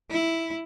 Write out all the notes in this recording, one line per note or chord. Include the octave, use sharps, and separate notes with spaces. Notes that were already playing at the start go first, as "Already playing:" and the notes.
E4